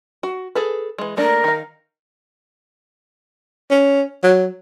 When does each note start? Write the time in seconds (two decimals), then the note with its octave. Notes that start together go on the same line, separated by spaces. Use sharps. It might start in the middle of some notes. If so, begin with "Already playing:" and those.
0.23 F#4
0.55 G#4 A4 B4
0.98 E3 G#3
1.17 A3 A#3 D4 A#4
1.44 D#3 F5
3.70 C#4
4.23 F#3